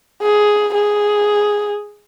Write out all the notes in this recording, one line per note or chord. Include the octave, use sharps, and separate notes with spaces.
G#4
G#4